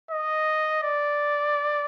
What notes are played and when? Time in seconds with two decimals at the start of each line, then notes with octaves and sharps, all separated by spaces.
0.11 D#5
0.83 D5